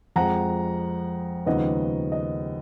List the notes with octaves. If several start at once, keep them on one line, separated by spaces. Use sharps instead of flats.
F2 F3 G#3 F#5 A#5
D#2 C#3 F3 G#3 B3 D#5 F#5
D#5